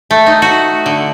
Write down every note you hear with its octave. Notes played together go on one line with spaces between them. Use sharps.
A3
D#4
F#4
D3